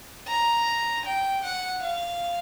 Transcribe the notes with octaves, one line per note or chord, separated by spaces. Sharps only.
A#5
G5
F#5
F5